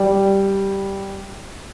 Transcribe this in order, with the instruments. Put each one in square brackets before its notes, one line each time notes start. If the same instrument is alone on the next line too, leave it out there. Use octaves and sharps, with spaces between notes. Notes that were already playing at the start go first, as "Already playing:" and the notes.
Already playing: [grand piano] G3